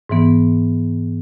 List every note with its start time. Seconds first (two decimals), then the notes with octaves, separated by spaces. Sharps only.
0.09 G#2 E3 B3